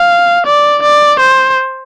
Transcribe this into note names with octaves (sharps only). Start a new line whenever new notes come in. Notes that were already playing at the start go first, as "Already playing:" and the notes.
Already playing: F5
D5
D5
C5